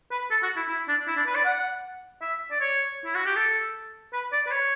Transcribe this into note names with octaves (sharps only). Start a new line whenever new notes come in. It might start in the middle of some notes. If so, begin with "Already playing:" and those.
B4
A4
F#4
E4
E4
D4
E4
D4
B4
D5
F#5
E5
D5
C#5
E4
F#4
G4
A4
B4
D5
B4
C#5